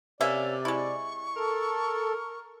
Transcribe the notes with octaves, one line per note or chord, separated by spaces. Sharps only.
C3 A#3 C#4 D5 E5
G#3 E4 C#6
A4 A#4